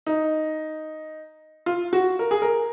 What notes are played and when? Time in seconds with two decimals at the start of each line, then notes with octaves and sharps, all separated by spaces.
0.07 D#4
1.66 F4
1.93 F#4
2.19 A#4
2.31 G#4
2.42 A#4